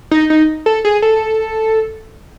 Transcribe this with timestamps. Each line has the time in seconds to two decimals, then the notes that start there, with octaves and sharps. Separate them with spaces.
0.11 D#4
0.30 D#4
0.66 A4
0.85 G#4
1.02 A4